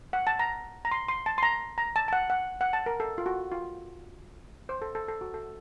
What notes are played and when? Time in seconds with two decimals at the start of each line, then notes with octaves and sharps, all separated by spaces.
0.13 F#5
0.27 A5
0.39 A#5
0.85 A#5
0.91 C6
1.08 C6
1.26 A5
1.38 C6
1.43 A#5
1.78 A#5
1.96 A5
2.08 A5
2.13 F#5
2.30 F#5
2.61 F#5
2.73 A5
2.86 A#4
3.00 A4
3.18 F4
3.26 F#4
3.52 F4
4.69 C5
4.82 A4
4.95 A4
5.08 A4
5.21 F#4
5.34 A4